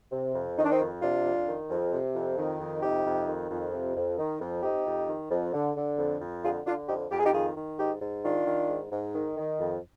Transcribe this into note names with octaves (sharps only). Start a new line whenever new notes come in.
C3
F2
D#3 D#4
D4
C4 D#4
F2
C3 D4 F4
F2
D#3
F2
C3
F2
D#3
F2
C3 D#4 G4
F2
D#3
F2
C3
F2
D#3
F2
C3 D#4 G4
F2
D#3
F2
D3
D3
F2
F2
D3 F4 G#4
D3 D4 F4
F2 D#4 G4
F2 G4
G#4
D#4 G4
D#3 F4 G#4
D#3
G#2 D#4 G4
G#2
D#3 D4 F4
D#3
G#2
G#2
D#3
D#3
F2